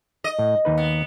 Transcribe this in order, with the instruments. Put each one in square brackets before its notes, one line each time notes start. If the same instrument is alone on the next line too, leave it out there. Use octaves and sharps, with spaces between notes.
[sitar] D#5
[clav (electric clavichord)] A2
D#2 D#4 B4
[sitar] B3